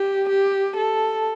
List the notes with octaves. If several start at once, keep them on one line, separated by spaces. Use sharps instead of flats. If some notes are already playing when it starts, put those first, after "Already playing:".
Already playing: G4
G4
A4